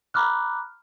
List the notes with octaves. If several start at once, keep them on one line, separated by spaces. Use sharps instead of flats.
A#5 B5 D6 F6 F#6